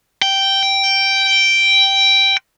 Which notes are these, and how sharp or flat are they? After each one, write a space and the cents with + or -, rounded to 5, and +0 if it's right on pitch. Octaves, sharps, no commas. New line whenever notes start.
G5 -5